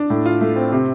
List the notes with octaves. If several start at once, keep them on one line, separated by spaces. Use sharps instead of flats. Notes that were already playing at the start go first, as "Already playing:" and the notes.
Already playing: D4
A2
F4
A3
C4
C3